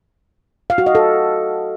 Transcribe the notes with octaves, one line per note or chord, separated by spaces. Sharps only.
F5
F#4
D#5
A4